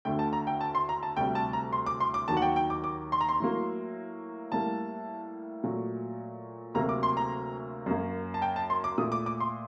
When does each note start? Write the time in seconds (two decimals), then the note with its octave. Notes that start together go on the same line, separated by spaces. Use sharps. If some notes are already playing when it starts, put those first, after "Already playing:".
0.05 D2 D3 A3 G5
0.19 A5
0.33 A#5
0.47 G5
0.61 A5
0.75 C6
0.89 A#5
1.03 A5
1.17 D2 C3 G3 G5
1.35 A5
1.53 A#5
1.73 C6
1.86 D6
2.00 C6
2.14 D6
2.28 D#2 D#3 F#3 A5
2.37 F#5
2.42 G5
2.56 G5
2.70 D6
2.84 D6
3.12 C6
3.21 A#5
3.29 C6
3.40 A2 F#3 A#3
4.52 A2 G3 A#3 A5
5.64 A#2 F#3 A3
6.74 D2 C3 F#3 A#3 A#5
6.89 D6
7.03 C6
7.17 A#5
7.86 F#2 F#3 A#3
8.34 A5
8.42 G5
8.56 A5
8.70 C6
8.84 D6
8.98 A#2 A3 D#6
9.12 D6
9.26 D6
9.40 C6